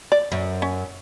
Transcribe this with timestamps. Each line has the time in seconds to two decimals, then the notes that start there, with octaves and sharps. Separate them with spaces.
0.12 D5
0.32 F#2
0.62 C#4